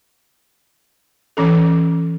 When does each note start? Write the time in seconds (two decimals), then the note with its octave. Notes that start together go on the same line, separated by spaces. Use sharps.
1.37 E3 C#4 A4